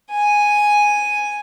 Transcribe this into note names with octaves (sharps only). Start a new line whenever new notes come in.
G#5